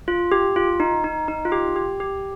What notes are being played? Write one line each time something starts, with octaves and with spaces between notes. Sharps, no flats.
F4
G4
F4
D#4
D#4
D#4
F4
G4
G4
G4